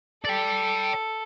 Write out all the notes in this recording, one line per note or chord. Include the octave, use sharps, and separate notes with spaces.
A4 D5 G5